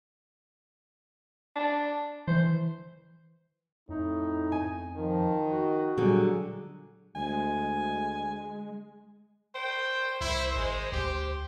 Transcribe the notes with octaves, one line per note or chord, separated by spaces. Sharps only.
D4
E3 C5
F2 A2 D#4
G#5
D#3 F3
F#4
A#2 D3 F#3 G3 G#4
D2 G#3 G#5
C5 G5
C2 E4
G#1 G#3
D2 G4